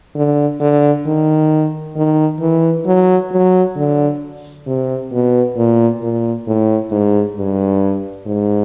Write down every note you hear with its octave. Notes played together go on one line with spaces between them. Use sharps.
D3
D3
D#3
D#3
E3
F#3
F#3
D3
C3
B2
A#2
A#2
A2
G#2
G2
G#2